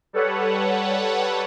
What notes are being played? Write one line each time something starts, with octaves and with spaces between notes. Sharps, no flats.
G3 A4 B4 C#5 F#5